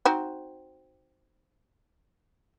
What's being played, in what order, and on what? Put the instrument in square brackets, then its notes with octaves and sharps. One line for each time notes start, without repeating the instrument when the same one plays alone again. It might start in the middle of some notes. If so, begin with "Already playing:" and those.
[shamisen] C4 D#4 F#4